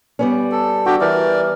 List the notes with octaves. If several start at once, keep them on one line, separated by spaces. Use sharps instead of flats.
G3 B3 C#4
A4
D4 F#4 G4 G5
E3 A#4 D5